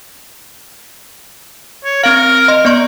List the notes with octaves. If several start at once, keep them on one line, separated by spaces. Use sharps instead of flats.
C#5
C4 A#4 F5
D#5 C6
B3 D5 C#6